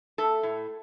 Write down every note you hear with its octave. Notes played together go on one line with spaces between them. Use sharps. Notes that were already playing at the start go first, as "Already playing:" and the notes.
A3 A4
A2